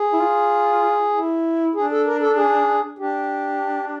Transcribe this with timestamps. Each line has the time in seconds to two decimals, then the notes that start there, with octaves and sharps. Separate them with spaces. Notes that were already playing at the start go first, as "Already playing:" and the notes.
Already playing: G#4
0.13 E4
0.21 F4
1.13 E4
1.75 D4 G#4
1.91 A4
2.06 A#4
2.21 A4
2.37 G#4
2.99 D4 G4